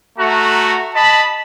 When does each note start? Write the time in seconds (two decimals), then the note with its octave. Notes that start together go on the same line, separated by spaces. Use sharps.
0.19 A3 F#4 A#5
0.95 D#5 A5 B5